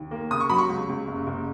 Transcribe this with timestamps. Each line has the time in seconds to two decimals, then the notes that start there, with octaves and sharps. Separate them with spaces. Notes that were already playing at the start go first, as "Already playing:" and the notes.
Already playing: D#2
0.11 A#3
0.30 C#3 D#6
0.40 C#6
0.50 F#3 B5
0.58 C#6
0.69 C#2
0.89 C#2
1.08 F#1
1.27 F#1